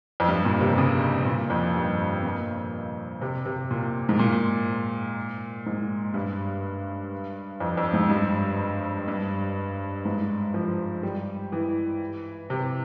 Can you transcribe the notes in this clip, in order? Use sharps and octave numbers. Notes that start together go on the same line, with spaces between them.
F2
G2
A#2
C3
C#3
A#2
F2
G2
A#2
C3
C3
A#2
G#2
A#2
G#2
G2
F2
F2
G#2
G2
G2
G#2
F3
G3
E3
C3